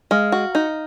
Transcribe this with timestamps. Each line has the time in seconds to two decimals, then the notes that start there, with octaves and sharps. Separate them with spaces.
0.11 G#3 F5 F6
0.32 F#4
0.55 D#4